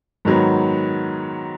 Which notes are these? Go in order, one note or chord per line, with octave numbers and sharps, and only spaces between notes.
G#2 D#3 F#3 B3